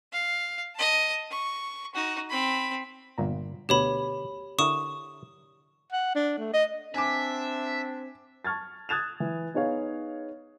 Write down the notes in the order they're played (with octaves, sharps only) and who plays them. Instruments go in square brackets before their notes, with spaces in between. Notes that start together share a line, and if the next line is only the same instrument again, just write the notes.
[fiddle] F5
D#5 A5
C#6
D#4 F#4
C4 B5
[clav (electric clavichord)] G1 A#2 A#5
[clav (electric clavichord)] D2 B2 [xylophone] G4 C#5 B5
[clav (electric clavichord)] D3 E4 A#4 [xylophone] C#6 D#6 E7
[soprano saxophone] F#5
D4
A3
D#5
[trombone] C4 [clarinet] D4 [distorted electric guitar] E5 [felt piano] G#5 D6
[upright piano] A5 C#6 F6 G#6 A6
D#6 F#6 G#6 A6 E7 F7
E3
B3 D#4 G#4 C#5 F5